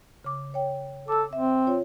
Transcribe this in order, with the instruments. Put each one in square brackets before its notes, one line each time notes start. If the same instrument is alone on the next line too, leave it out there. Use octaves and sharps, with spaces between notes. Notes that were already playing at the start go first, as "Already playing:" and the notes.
[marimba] C#3 D6
C#5 G5
[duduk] A4 [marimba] D6 E6
[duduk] C4 [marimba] E5
[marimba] F4 C#5